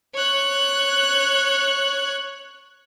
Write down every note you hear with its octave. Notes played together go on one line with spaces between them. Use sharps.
C#5 F#6